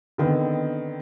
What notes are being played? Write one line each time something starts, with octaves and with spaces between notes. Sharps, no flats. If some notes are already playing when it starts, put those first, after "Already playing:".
D3 D#3 B3 C4